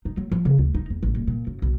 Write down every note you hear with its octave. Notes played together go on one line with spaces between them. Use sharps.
D#4
F#3
F3
C#3
D2
D#4
E2
A1
D#1
A#2
F#2
B1